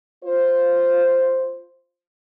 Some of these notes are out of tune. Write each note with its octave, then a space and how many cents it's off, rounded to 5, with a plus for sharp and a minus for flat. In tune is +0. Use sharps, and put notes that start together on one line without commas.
F4 +0 C5 +0